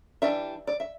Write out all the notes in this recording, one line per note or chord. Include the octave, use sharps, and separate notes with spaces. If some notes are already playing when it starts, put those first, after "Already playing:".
E3 G3 D4 E5
D5
E5